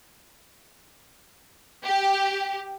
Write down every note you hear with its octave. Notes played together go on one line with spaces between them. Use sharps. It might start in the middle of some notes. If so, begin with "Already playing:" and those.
G4